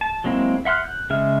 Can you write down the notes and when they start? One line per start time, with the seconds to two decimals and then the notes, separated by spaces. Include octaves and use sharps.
0.01 A5
0.24 F#3 G#3 A#3 C4 E4
0.65 E5 F#5 C6 F6 F#6
0.84 F#6 G6
1.10 C#3 G#3 E5 F6